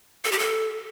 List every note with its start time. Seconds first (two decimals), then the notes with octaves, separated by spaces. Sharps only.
0.24 A4
0.32 G4
0.39 A4